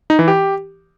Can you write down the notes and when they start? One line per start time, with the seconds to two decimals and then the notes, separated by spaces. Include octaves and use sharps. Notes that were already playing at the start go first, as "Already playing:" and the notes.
0.10 D#4
0.19 E3
0.28 G4